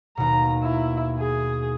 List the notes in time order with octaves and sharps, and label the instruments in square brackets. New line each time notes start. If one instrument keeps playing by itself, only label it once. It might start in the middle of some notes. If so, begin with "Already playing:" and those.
[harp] D#2 B2 [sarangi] A#5
[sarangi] E4
G#4